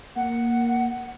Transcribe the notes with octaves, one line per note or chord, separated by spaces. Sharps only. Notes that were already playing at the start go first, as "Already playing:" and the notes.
A#3 F#5